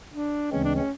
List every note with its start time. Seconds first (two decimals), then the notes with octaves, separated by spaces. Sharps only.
0.13 D4
0.52 D2 C#3 E3 G#3 C4 C#4
0.64 D4
0.75 C#4